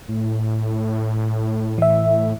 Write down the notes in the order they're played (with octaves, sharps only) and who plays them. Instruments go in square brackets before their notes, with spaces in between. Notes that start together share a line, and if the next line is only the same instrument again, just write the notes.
[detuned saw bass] A2
[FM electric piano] E3 E5